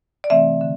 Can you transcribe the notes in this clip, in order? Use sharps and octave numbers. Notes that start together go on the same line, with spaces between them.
D5
C3 E3 A3 C4 E5
D3